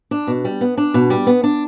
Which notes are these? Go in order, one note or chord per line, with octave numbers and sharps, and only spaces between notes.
D4
B2
G3
B3
D4
B2
G3
B3
D4